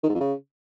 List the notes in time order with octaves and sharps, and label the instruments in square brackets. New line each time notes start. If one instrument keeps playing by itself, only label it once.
[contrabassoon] D#3
G#2
F2
C#3